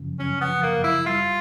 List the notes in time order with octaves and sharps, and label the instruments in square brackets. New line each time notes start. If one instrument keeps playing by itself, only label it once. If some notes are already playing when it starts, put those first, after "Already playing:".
Already playing: [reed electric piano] F#2 C#3 F3
[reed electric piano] F#2 [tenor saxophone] C#4
[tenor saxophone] B3
[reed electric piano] F3
[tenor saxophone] A#3
[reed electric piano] F#2
[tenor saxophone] E4
[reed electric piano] G3 [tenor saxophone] F4